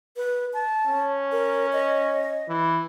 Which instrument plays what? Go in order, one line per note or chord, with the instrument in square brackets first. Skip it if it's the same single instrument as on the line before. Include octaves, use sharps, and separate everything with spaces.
[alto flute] B4
A5
[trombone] C#4
[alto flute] A#4
D#5
[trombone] E3